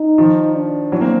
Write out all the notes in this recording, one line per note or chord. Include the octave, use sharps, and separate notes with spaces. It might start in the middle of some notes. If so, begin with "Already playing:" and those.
Already playing: D#4
D#3 F3
D4
E3 F#3
A#3 C4